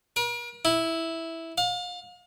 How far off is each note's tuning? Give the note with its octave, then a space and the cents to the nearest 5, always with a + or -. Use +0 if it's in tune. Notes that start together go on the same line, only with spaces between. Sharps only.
A#4 +45
E4 -5
F5 +35